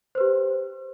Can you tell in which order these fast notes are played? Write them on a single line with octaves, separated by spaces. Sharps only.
C5 B4 G4